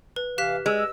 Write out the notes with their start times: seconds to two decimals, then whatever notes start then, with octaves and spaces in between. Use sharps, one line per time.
0.16 B4
0.38 C3 E3 G4 F5 F#6 B6
0.66 G#3 E6